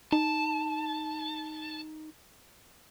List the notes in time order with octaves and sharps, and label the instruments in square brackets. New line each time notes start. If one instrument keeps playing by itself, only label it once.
[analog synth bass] D#4 [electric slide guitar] A5